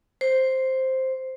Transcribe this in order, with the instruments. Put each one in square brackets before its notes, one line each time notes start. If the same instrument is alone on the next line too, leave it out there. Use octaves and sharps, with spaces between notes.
[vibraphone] C5